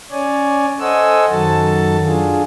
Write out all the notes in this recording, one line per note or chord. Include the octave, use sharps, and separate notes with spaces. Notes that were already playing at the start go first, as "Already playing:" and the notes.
C#4 C#5 D5 G#5
A4 C5 D#5 F#5 G#5 E6
F#2 D#3 F#3 F#4 A4 A5
D4 F4 G#4